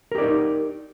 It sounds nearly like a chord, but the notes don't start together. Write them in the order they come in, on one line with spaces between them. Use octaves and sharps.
A#4 G4 D5 D#4